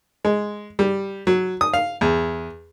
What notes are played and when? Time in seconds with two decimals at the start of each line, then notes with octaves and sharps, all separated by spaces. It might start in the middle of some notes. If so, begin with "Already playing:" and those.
0.25 G#3
0.79 G3
1.27 F#3
1.61 D#6
1.74 F5
2.01 E2